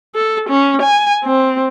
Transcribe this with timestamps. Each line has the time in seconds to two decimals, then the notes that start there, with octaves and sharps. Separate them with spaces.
0.15 A4
0.50 C#4
0.82 G#5
1.24 C4